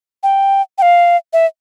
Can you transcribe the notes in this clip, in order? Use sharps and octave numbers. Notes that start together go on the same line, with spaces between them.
G5
G5
F5
E5